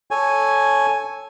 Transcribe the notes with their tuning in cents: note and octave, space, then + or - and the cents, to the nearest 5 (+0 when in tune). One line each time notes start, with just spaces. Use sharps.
A4 -10 C#5 +0 G#5 +0